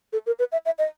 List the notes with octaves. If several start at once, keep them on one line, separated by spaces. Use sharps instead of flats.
A4
A#4
B4
E5
E5
D#5